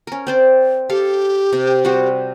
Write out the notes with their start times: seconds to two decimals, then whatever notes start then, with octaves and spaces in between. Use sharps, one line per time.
0.07 C#4 A#4
0.27 C4 C5 D5
0.89 G4 A4 F5
1.52 C3
1.85 G3 C4 F#4